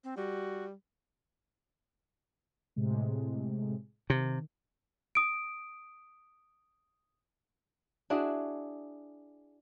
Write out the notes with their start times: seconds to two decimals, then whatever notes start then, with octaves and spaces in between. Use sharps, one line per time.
0.04 C4
0.17 G3 F#4
2.76 A2 C3 G#3
4.10 C3 D#3
5.15 D#6 D7
8.10 D4 E4 F#4 G#4